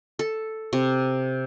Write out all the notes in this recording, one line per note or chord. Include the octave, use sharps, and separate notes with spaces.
A4
C3